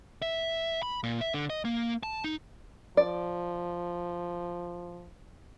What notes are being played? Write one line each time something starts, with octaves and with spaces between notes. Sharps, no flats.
E5
B5
A#2
E5
D3
D#5
A#3
A5
D#4
F3 D5